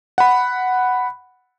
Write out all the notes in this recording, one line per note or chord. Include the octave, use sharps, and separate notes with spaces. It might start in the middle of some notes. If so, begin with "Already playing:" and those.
F#5 B5